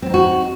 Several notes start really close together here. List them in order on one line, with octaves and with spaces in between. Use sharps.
C4 B3 D#4 F#4